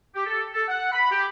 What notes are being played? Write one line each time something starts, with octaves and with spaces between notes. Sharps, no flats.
G4
A4
A4
F#5
B5
G4